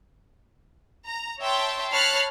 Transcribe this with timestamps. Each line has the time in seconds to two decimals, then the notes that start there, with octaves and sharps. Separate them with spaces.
1.06 A#5
1.40 C#5 E5 G5 A5 C6
1.93 C#5 A5 B5 F6 F#6 C7